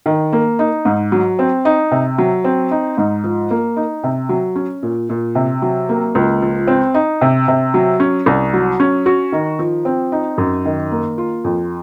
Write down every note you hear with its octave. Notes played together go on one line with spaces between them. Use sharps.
D#3
A#3
D#4
G#2
F#3
C4
D#4
C3
F#3
C4
D#4
G#2
F3
A#3
D#4
C3
F#3
C#4
A#2
A#2
C3
F#3
A#3
C#2
F3
C4
D#4
C3
C3
F#3
C#4
C2
F#3
C#4
F#4
D#3
F3
C4
D#4
F#2
D#3
A#3
F4
F2